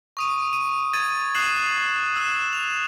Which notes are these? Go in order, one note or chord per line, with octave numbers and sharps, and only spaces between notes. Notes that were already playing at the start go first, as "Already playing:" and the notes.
C#6 D#6 D#7
D#7
G#6 A6 D#7
D#6 F#6 C7 E7 F#7
E6 F#6 E7
F7